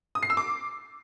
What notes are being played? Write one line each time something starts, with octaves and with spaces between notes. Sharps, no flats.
D#6
C7
E6
D6